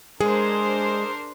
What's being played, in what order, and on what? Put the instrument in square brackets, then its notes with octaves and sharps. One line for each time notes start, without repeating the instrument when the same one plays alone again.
[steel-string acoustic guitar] G#3 [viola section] D4 A#4 C5 [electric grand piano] G#4